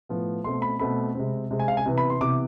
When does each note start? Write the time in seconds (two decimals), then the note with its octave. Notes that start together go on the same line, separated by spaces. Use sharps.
0.09 A2 F3 B3
0.44 B2 A3 C4 C6
0.62 B5
0.79 B2 A3 C4 B5
1.15 C3 G#3 C4
1.51 C3 G#3 C4
1.59 G#5
1.68 F5
1.77 G#5
1.86 C3 E3 B3
1.98 B5
2.10 C6
2.21 C3 E3 B3 D6